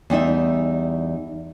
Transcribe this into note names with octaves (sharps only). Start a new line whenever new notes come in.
E2 G3 D#4 E5